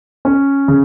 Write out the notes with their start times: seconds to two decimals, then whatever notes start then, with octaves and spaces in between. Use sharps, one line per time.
0.25 C#4
0.68 C#3